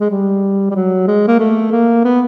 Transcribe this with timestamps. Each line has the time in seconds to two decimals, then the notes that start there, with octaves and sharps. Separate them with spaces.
0.01 G#3
0.11 G3
0.71 G3
0.75 F#3
1.07 G#3
1.28 A#3
1.39 A3
1.72 A#3
2.05 B3